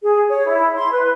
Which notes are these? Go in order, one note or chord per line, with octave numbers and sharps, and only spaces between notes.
G#4
C#5
E4
C6
B4